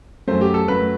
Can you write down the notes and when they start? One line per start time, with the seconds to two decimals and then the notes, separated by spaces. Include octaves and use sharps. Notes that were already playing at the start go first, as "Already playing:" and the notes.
0.28 F#2 F#3 A3 C5
0.41 G4
0.54 A4
0.68 F#2 F#3 A3 B4